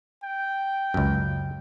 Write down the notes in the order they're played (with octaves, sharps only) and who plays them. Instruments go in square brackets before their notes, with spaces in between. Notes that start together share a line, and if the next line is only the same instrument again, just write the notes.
[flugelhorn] G5
[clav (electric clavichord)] C#2 F#2